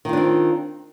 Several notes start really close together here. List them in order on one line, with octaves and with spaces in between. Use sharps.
D#3 F4 D4 C4